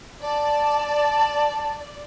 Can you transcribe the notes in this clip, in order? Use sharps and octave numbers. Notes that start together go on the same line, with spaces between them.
D5 A5